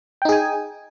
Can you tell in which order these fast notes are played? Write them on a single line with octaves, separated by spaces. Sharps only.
G5 D#4 G#4 G#5